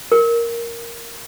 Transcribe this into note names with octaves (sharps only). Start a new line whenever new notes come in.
A#4